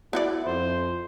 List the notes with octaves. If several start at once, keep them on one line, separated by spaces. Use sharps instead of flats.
B3 E4 F#4 D5
F2 C5